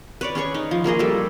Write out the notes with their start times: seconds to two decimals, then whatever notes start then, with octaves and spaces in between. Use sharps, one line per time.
0.21 B4 C#5 D5
0.35 C#4 G#4 C#5 C#6
0.54 D#4
0.71 F3
0.84 F3 A#3 G#4 D#5
0.99 G3 A4